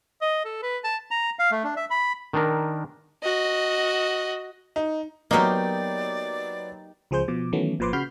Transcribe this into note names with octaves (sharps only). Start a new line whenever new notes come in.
D#5
A4
B4
A5
A#5
F5
A3
D4
E5
B5
D#3 D4 A#4
F#4 D#5
D#4
F#3 A#3 B3 D#4 F#4 G4 A#4 D5
C#2 F3 G#4 C5 G6
B2 F3 D6
D#3 E3 F#3 A3 B3 C#4
G#1 A#2 F3 B4 C6 D6
C#3 F#4 B5 F6 G6 C7